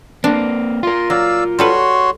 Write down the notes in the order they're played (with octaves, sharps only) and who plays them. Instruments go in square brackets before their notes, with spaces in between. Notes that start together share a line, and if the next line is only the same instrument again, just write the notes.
[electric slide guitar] A#3 C4 [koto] D4
[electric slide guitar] F4 A#4 [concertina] C6
[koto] F#3 [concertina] D5 F5 E6
[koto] G3 A4 B4 [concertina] F#4 C#5 C6